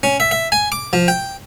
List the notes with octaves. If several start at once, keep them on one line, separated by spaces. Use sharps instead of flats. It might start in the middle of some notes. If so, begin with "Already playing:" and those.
C#4
E5
E5
G#5
D6
F3
G5